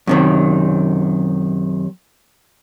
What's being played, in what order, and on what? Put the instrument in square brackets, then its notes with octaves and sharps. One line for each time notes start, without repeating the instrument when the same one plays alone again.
[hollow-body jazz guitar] F#2 C3 D#3